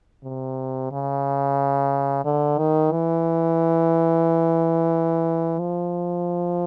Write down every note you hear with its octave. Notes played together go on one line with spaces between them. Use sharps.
C3
C#3
D3
D#3
E3
F3